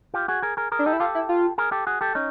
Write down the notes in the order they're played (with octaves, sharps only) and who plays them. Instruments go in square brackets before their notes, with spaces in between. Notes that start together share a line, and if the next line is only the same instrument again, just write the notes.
[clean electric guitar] F4 G4
F#4 G#4
G#4 A#4
G#4 A#4
G#4 A#4
[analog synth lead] D4
[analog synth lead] D#4 [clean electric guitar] G4 A4
[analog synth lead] E4
[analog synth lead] F4 [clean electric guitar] G4 A4
[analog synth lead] E4
F4
[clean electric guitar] G#4 A#4
G4 A4
F#4 G#4
G4 A4
C#4 D#4